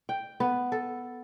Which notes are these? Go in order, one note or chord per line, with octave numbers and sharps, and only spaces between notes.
G5
B3
A4